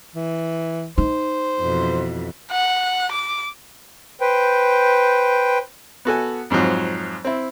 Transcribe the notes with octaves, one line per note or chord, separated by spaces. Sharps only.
E3
D#4 C5
F2 B2 E3
F#5
D6
B4 C5 G5
B3 F#4 A4 G#5
F2 G#2 F3 F#3
C4 E4